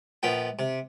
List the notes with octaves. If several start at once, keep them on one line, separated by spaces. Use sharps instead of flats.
A#1 F3 B3 G5
C3